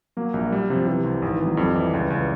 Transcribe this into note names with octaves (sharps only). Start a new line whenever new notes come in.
F#3 A#3
A#1 F#3
F#3 G3
C3 F3
C3 E3
C2
G#1 D#3
E3
G#1
F#3
F2 G3
E3
C#2
C#2